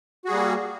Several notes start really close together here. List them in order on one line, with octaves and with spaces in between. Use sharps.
F#4 G#4 G3 A#3